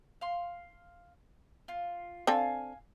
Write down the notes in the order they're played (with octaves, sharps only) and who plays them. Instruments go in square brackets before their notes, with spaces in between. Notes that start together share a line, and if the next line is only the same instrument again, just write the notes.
[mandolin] F5 C6
F4
[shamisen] C4 D4 A4 [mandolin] F5 G#5 E6